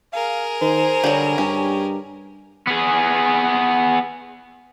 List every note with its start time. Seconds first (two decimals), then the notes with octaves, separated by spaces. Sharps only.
0.13 G#4 A#4 F5
0.61 D#3 C5
1.04 D3 F#3 G3
1.38 G2 C#4 G4
2.67 B3 G#4